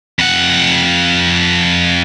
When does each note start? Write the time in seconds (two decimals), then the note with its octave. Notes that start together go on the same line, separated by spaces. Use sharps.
0.19 F2 F#5